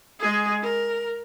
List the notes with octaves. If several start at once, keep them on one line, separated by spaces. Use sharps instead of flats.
G#3 G#4
A#4